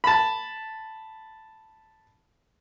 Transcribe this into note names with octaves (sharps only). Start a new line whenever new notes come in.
A5 B5